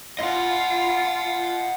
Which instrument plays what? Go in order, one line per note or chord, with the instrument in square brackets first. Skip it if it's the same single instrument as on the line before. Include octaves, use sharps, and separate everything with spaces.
[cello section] F4 [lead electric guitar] D#5 F#5